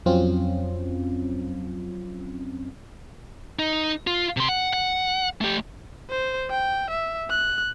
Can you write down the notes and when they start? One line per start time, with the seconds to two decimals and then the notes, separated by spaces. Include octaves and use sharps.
0.06 F2 F#3 C4 C#4 F4
3.59 D#4
4.07 F4
4.37 C3 C6
4.48 F#5
4.73 F#5
5.41 A3 G4
6.10 C5
6.51 G5
6.91 E5
7.30 F#6